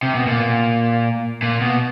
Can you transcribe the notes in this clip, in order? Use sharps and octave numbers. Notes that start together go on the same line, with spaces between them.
C3
B2
A#2
A#2
B2